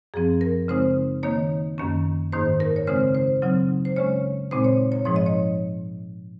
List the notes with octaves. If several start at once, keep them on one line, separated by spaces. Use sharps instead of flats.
F#2 F3 C4 G#4
A#4
C#3 G#3 C4 D#4 C5
D#3 A#3 D#4 C#5
F#2 D#3 A#3 C#4
G#2 D#3 A#3 D#4 C5
A#4
C#5
C#3 G#3 C4 D#4 C5
C5
C#3 F#3 C4 D#4
C5
C#3 G#3 C#4 C#5
A#2 G#3 C4 D#4 C5
C#5
C#5
G#2 F3 G#3 D#4 C#5
D#5
C#5